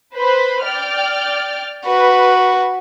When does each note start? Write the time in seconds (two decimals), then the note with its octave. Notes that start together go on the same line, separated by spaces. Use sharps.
0.15 B4 C5 B5
0.63 D5 G5 F6
1.85 F#4 B4